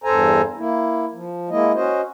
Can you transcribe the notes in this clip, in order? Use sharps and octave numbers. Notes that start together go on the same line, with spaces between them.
E2 G2 A4 C5 G#5 A#5
A#3 E4
F3
G#3 A#3 E4 D#5
C#4 F#4 C5 D#5